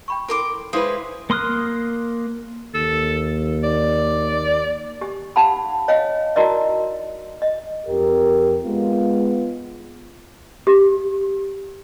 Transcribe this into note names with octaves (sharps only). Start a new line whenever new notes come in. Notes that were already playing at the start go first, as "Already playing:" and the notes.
G5 B5 C#6
E4 A4 A#4 C6 D6
G#3 E4 B4 C5 F5 D#6
A#3 C6 D#6 F6 F#6
D#2 A4
D5
G4
D#4 G4 F5 F#5 A5 B5
C#5 D#5 F5 G5
D#4 E4 F#4 A#4 D5 D#5
D#5
F2 G4 A#4
G#3 B3 F4
G4